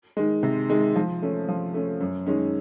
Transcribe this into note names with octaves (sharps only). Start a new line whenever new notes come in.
D#3 G#3
C3
D#3 G#3
F3
A3 C#4
F3
A3 C#4
F#2
D#3 G#3 C#4